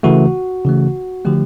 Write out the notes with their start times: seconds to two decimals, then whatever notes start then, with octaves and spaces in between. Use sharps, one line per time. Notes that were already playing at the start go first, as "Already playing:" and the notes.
0.03 C#3 E3 A3 F#4
0.65 C#3 E3 A3
1.25 D3 F3 A3 G4